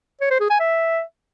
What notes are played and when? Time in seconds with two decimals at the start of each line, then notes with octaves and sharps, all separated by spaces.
0.21 C#5
0.31 C5
0.40 G#4
0.50 G#5
0.60 E5